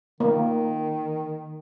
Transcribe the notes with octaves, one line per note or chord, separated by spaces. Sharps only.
D#3 A#3